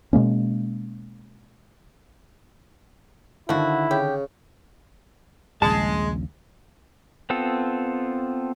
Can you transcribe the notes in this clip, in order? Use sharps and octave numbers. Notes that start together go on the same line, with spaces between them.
B2 G#3 A#3 C#4
D3 D#3 F3 E4 F#4
C#3 G4
D#1 A#1 C#3 G#3 A5
B3 C4 F4 A4